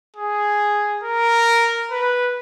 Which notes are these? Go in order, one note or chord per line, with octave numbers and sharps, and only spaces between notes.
G#4
A#4
B4